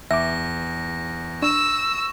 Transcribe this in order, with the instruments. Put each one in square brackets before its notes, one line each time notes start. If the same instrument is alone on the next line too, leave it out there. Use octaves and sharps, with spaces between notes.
[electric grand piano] E2 [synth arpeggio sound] E5 D6 [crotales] A#6
[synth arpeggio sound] D4 [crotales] C#6 E7 [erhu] E6